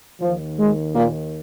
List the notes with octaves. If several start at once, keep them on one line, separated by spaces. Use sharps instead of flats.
D#2 D#3 F3
G#3
A#2 A#3